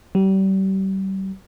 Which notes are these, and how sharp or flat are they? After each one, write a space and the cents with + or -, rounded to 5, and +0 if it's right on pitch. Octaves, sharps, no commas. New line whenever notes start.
G3 -35